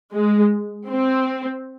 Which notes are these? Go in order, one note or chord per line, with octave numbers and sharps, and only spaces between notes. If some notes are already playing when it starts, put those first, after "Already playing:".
G#3
C4